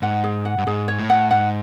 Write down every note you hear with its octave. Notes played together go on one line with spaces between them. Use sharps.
G#2 F#5
G#4
F#5
G2
G#2 G#4
C#5
A2
F#5
G#2 F#5